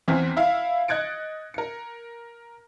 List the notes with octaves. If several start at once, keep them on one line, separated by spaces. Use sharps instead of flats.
E2 E3 C4 F6 B6
E4 E5 F5
D#5 F#6 G#6 A6 C#7 D7
A#4 C#7